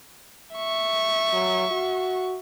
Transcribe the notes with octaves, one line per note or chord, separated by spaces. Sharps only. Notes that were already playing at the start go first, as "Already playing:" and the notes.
E5 C#6
F#3
F#4